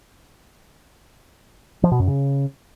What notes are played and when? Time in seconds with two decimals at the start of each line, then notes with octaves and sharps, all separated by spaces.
1.83 F3
1.91 B2
1.99 F#2
2.07 C#3